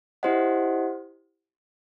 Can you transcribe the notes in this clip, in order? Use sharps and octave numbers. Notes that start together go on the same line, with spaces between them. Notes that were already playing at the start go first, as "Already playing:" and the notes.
E4 G4 C5 D#5 F#5